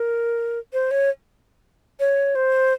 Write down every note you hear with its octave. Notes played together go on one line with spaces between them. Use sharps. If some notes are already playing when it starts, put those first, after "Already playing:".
Already playing: A#4
C5
C#5
C#5
C5